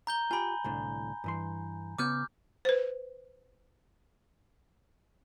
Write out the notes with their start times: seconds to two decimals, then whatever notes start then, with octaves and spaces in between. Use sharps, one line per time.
0.07 A#5 G6 G7
0.31 F4 G4 G#5 B5
0.64 C2 A2 D3
1.24 G2 E3 C6
1.99 C#3 B3 F#4 D6 F6 G6
2.65 B4 C5